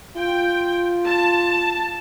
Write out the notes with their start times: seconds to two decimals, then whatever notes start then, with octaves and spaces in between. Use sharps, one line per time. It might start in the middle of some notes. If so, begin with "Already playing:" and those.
0.17 F4 G5
1.07 A5